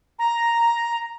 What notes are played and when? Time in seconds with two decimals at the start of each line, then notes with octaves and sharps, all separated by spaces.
0.19 A#5